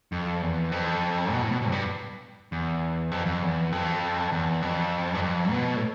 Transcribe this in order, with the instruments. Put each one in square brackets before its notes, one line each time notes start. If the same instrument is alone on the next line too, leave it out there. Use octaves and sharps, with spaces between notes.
[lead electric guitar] F2
E2
F2
B2
A2
B2
B2
F2
G2
E2
F2
F2
E2
F2
E2
F2
G2
F2
B2
A2